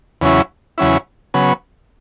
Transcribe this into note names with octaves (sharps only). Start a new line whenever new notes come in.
E2 C#3 F#3 C#4 E4
E2 C#3 F#3 C#4 E4
C#3 F#3 B3